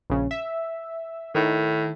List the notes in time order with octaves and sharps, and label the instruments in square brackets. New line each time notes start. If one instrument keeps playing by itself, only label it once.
[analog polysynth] A#1 C#3
E5
[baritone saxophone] A2 [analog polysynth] D#3